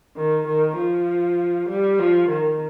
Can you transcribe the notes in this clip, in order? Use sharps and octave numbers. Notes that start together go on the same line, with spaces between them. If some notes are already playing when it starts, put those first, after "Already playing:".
D#3
D#3
F3
G3
F3
D#3